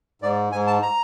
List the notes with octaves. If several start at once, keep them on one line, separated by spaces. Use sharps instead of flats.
G#2 D5
G#2 G#5
A5
A#5